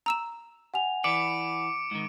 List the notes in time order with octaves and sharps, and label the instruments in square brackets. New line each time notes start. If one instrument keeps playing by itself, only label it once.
[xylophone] A#5 E6 E7
[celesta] F#5 G#5 F7
[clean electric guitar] E3 B4 D5 [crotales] D6 C#7 D7
[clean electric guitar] G#2 D#3